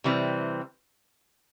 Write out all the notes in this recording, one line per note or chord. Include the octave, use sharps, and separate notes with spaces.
C3 E3 G3 C4